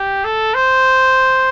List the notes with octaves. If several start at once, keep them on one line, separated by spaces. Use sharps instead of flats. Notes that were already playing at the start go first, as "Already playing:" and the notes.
Already playing: G4
A4
C5